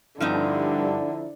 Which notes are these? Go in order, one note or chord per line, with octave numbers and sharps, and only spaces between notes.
G2 D3 F3 C4 D#4 E4